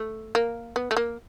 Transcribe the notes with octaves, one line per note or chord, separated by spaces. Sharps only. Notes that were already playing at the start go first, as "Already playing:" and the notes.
Already playing: A3
A#3
B3
A3
A#3